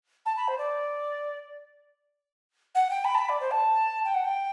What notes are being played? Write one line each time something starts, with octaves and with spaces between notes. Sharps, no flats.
A5
B5
C5
D5
F#5
G5
B5
A5
B5
D5
C5
A5
G5
F#5
G5